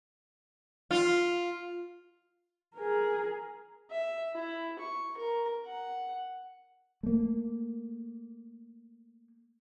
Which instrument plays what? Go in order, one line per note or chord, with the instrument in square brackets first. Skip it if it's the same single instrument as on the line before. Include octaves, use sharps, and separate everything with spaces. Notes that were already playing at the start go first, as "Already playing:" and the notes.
[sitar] F4
[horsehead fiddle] G#4 A#4
[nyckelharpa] E5
E4
C#6
A#4
F#5
[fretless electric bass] A3 A#3